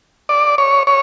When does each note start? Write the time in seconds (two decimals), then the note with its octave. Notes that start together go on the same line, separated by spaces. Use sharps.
0.29 D5
0.58 C#5
0.87 C#5